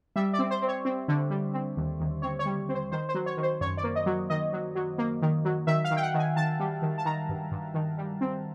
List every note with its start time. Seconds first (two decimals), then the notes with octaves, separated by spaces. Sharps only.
0.16 G3 E5
0.33 D5
0.39 C4
0.51 C5
0.62 C4
0.68 C#5
0.85 C4
1.08 D3
1.30 G3
1.54 C4
1.76 D#2
2.00 D#2
2.22 C4 C#5
2.39 C#5
2.46 G3
2.69 C4
2.74 C5
2.92 D#3 C5
3.09 C5
3.14 F#3
3.26 C#5
3.37 D#3
3.43 C5
3.61 F#2 C#5
3.77 D5
3.83 A#3
3.96 D#5
4.06 F#3
4.30 D#3 D#5
4.53 F#3
4.75 F#3
4.98 A#3
5.22 D#3
5.45 F#3
5.67 D#3 E5
5.84 F5
5.91 D#3
5.97 G5
6.02 F#5
6.14 D#3 G#5
6.36 D#3 A5
6.60 G3
6.82 D#3
6.98 A5
7.05 D#3 A#5
7.29 G2
7.51 G2
7.74 D#3
7.98 G3
8.21 C4